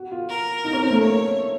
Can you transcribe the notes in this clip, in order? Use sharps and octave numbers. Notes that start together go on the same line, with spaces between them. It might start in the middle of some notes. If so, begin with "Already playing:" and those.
Already playing: F#4
F4
A#4
D#4
C#4
C4
A3
A#3 C#5